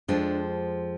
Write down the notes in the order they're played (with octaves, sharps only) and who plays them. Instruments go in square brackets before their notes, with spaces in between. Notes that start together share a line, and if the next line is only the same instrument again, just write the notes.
[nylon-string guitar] F2 F3 G#3 D4